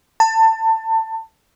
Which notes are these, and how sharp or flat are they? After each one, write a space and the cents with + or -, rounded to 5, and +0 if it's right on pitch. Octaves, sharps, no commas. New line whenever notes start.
A5 +25